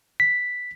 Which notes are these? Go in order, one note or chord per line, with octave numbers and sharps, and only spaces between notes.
B6